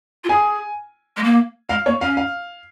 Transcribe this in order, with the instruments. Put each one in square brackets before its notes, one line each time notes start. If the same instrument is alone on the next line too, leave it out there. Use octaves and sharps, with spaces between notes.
[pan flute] F4
[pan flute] G#4 [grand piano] G#5
[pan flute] G#3
A#3
[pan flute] G#3 [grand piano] F5
[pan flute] A#3 [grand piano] C#5
[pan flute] C#4 [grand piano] F5
[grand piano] F5